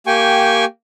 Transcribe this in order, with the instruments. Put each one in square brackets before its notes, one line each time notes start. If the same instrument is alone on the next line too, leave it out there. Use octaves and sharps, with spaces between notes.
[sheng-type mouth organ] A#3 G4 G5 G#5 C#6